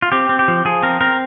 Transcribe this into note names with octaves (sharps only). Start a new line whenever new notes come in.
F4
C4 G4
C4
G4
F3
F3 G#4
C4 A#4
C4 A#4